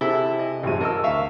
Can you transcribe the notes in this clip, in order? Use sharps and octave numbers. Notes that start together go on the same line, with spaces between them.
C3 E4 G#4 A4
D#5
A1 F#2 C3 G#3 D#7
A#4 D#5 A5 E6
D2 E5 F5 C#6